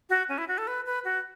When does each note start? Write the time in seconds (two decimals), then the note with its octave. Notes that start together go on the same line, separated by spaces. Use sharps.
0.10 F#4
0.29 C#4
0.38 E4
0.48 F#4
0.58 A4
0.67 B4
0.86 B4
1.05 F#4